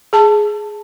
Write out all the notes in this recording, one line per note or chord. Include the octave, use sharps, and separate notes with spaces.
G#4 A5